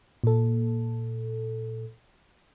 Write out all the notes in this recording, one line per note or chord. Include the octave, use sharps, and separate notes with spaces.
A#2 A4